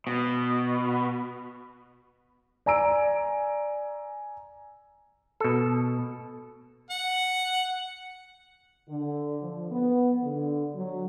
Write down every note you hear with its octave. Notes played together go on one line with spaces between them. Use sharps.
B2
D5 G#5 A#5 E6 D7
B2 A4
F#5
D3
F3
B3
D3
F#3